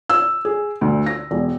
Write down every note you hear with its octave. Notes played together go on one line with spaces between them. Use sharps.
E6
G#4
D2
A#6
E1